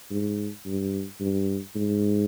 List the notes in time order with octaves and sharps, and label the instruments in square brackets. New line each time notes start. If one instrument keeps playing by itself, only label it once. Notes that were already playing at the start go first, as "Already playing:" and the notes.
[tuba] G#2
G2
G2
G#2